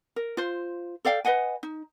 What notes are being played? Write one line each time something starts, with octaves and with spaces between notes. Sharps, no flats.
A#4
F4 C5
A4 D5 F5 G5
B4 D#5 F#5 G#5
D#4